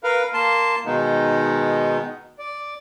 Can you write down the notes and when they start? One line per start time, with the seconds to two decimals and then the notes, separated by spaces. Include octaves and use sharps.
0.04 A#4 B4 F5
0.34 A#3 A5 C6
0.86 B2 D#3 G#3 B3 D#4
2.39 D5